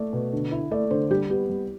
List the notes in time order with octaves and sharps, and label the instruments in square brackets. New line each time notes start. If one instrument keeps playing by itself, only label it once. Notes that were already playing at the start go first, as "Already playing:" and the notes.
Already playing: [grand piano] A3 [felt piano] D5
[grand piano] B2
D3
E4
[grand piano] A3 [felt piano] D5
[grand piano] D3 [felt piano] C5
[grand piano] G3 [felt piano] G4
[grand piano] B3 [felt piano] G4
[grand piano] G3